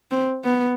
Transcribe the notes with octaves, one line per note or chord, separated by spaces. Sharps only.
C4
B3